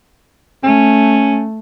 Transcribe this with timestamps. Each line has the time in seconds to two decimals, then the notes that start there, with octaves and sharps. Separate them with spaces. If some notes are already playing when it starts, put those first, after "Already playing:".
0.64 A3 C#4